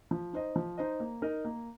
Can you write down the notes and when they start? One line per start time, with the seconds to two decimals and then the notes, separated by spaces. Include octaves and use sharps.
0.11 F3
0.33 D#4 C5 D#5
0.56 F3
0.78 D#4 C5 D#5
1.00 A#3
1.22 D#4 A#4 D#5
1.45 A#3